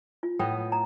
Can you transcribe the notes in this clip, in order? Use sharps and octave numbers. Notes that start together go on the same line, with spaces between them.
F4
A2 B3 D#5 G5
A#5